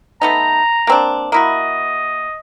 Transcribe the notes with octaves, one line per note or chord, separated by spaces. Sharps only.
A3 B3 D#4 A#5
A#3 C4 D4
A#3 E4 F#4 D#5